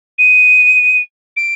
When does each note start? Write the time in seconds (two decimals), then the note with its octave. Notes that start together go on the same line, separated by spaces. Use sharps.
0.18 D#7
1.36 D7